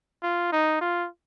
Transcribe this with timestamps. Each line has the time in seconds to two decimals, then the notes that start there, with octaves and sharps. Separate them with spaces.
0.23 F4
0.52 D#4
0.81 F4